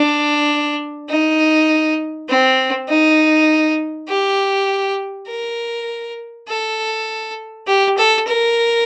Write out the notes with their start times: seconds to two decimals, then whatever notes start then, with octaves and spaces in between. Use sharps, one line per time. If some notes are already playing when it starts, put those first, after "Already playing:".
Already playing: D4
1.09 D#4
2.29 C4
2.89 D#4
4.09 G4
5.28 A#4
6.48 A4
7.67 G4
7.98 A4
8.28 A#4